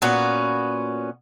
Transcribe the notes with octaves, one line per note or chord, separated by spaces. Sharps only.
A#2 B3 C#4 F#4